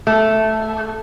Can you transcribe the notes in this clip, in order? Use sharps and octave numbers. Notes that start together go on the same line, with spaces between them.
A3